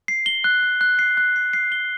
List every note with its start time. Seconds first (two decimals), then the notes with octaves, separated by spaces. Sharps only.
0.08 C7
0.26 G7
0.44 F#6
0.63 F#6
0.81 F#6
0.99 C7
1.17 F#6
1.36 C7
1.53 C7
1.72 G7